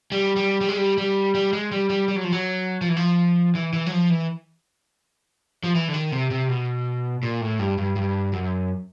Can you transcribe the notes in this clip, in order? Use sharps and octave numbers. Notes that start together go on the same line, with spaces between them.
G3
G3
G3
G#3
G3
G3
G3
G#3
G3
G3
G3
F#3
F3
F#3
F3
E3
F3
E3
E3
F#3
F3
E3
F3
E3
D3
D#3
C3
C3
B2
A#2
A2
G2
G2
G2
F#2